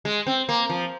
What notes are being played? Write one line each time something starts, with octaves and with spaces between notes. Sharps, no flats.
G#3
C4
A#3
F3